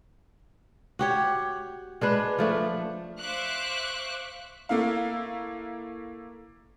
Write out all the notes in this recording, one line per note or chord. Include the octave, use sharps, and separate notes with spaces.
F#4 G4 C#5
G#3 D4 B4
F3 A3 D4
C5 E5 F5 C#6 D6 F#6
A3 A#3 E4 F5